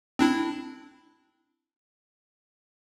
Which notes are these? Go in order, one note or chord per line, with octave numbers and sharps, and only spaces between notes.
C4 D4 E4